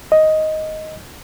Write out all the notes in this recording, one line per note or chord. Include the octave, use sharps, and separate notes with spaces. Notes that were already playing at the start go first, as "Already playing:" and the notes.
D#5